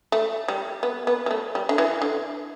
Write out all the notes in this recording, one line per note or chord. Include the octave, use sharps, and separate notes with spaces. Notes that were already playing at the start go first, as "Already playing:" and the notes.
A3
G3
B3
B3
G3
A3
G3
D3
E3
D3